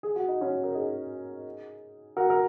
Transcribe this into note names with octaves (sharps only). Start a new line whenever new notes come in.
G#4
F#4
D#4
C#4 F#4
A#4
D#4 G#4
F#4 A#4
A#4